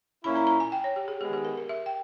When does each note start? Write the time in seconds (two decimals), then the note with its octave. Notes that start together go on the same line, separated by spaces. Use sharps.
0.23 A#2 A#3 C#4 E4 B5
0.36 A#5
0.47 A#5
0.60 G#5
0.72 G5
0.84 C#5
0.96 G4
1.08 G#4
1.20 D#3 G#3 B3 G4
1.33 G4
1.45 A#4
1.58 A#4
1.69 E5
1.86 G5